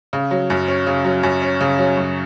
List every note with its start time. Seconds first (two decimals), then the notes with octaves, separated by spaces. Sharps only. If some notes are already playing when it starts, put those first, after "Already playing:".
0.13 C#3
0.31 F#3
0.50 F#2
0.68 C#4
0.87 C#3
1.05 F#3
1.23 F#2
1.42 C#4
1.61 C#3
1.79 F#3
1.97 F#2